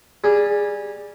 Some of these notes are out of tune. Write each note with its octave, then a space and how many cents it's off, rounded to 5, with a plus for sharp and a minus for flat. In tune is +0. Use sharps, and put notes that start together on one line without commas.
G3 +5 G#4 -15 B5 -30